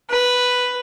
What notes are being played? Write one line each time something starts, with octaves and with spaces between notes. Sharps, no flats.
B4